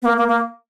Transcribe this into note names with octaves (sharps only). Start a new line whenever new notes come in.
B3
A#3
A#3
A#3